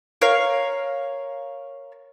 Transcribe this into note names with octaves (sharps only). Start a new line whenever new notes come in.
A#4 C#5 F5